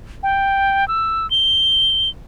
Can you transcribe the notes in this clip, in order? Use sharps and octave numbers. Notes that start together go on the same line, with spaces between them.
G5
E6
G7